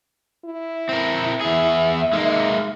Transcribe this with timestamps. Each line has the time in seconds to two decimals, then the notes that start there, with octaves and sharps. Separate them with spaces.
0.45 E4
0.89 C4 A#4
1.41 E2 G#4 E5
2.13 G#3 A#3 D#4